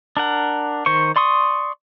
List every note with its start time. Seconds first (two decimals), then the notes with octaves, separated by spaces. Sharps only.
0.17 D4 A#4 F#5
0.86 D#3 C5 C#6
1.16 D5 C6 C#6 D#6